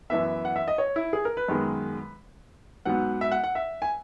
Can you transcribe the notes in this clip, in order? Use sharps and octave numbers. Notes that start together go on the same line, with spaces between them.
F#2 E3 B3 E5
F#5
E5
D#5
C#5
E4
G#4
A#4
B4
F#2 D#3 G#3 B3
G#2 F#3 B3 F#5
E5
F#5
F#5
E5
G#5